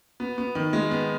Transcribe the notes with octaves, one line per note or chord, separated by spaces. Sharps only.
B3
B3
D#3
G#3
B3